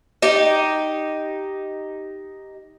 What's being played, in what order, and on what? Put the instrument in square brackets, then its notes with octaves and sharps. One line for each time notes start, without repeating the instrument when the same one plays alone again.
[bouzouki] D#4 G4